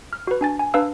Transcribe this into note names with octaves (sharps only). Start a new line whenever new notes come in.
F6
F#4 B4
D4 G#5 A6
G#5
D4 B4 F5 E6